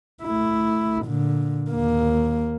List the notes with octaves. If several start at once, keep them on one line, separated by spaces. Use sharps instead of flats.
A3 E4
A#2 D3
D#2 A#3